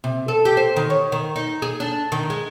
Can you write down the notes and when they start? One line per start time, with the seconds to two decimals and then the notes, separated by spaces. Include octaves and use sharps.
0.04 C3
0.28 A4
0.45 G4
0.57 C5
0.77 D#3
0.90 C#5
1.12 D#3
1.36 D#4
1.62 G#4
1.80 D4
2.12 D#3
2.30 G#3